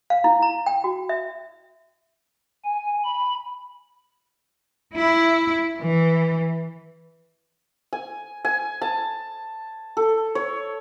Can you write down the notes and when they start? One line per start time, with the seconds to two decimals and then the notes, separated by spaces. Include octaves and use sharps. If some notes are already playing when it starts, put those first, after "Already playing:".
0.10 F5
0.24 E4
0.42 A#5
0.66 G5
0.84 F#4
1.09 E5
2.65 G#5
3.04 B5
4.95 E4
5.79 E3
7.93 G#5
8.45 G#5
8.82 A5
9.97 A4
10.35 C#5